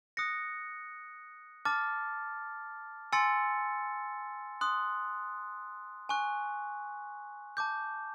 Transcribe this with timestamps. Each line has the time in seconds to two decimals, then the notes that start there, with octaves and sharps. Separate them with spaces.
0.17 D#6 F#6 A#6 C#7
1.65 A5 D6 F6 A6
3.13 G#5 C6 E6 A6 C#7
4.61 C6 D#6 F#6
6.09 G#5 C#6 F#6
7.57 A5 D6 G6